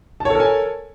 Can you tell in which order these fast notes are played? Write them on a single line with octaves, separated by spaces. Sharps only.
A5 C#5 A4 A#4 G#5